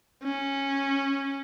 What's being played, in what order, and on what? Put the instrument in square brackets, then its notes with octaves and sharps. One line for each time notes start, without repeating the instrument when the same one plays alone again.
[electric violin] C#4